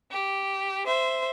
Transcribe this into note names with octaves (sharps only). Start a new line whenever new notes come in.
G4
C5 E5